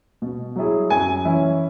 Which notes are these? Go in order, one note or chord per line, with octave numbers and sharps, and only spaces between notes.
B2
F#3 E4 G#4
F#2 G#5
E3 C#4 E4